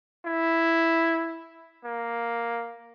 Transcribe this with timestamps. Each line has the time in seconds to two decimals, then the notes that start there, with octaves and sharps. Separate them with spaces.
0.25 E4
1.84 A#3